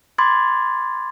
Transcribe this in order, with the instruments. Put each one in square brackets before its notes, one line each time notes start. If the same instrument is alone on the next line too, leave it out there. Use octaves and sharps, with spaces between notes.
[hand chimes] B5 C6 D6 G#6 A6